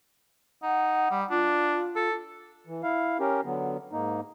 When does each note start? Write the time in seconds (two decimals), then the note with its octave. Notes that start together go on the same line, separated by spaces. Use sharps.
0.63 D#4 F#5
1.11 G3
1.30 D4 F4
1.96 A4
2.66 E3
2.83 E4 F5
3.20 C#4 G4 A#4
3.45 D3 F#3 B3
3.92 G#2 A#3 D#4